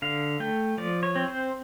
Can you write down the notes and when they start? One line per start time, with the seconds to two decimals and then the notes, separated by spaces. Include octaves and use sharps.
0.02 D3 F5
0.40 A3 G5
0.77 F3 D5
1.03 C#5
1.16 C4
1.28 C5